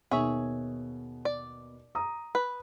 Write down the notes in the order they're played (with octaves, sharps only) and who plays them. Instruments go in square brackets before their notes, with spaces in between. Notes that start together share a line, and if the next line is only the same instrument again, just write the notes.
[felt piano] D#2 B2 [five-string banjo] G#4 C#5 E5
[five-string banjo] D5
[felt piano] A#5 D#6
[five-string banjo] B4